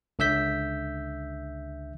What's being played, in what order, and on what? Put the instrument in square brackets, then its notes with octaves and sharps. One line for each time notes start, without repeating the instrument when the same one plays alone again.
[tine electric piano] C#2 D3 E5 E6 G6 B6